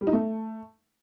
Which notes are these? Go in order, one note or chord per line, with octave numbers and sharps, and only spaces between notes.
G3
D#4
A3